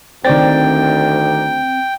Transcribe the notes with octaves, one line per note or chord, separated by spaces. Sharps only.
D2 D#3 C4 D5 G5 A6